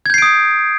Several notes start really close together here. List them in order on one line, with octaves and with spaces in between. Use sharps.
G#6 G6 C7 D7 D#6